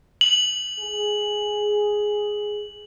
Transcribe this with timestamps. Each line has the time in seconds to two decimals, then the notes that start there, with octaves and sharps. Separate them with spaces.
0.21 F#7
0.79 G#4